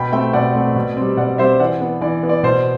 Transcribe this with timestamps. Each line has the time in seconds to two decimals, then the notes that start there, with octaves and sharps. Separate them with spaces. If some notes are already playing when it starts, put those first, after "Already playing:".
Already playing: B2 G5 B5
0.12 A3 C4 E5 G5
0.33 B2 D5 F#5
0.55 A3 C4
0.76 B2
0.97 G3 C4
1.17 B2 D5 F#5
1.38 G3 C4 C5 E5
1.60 E3 D5 F#5
1.81 B3
2.01 E3 D5
2.23 B3
2.29 D5
2.43 B2 C5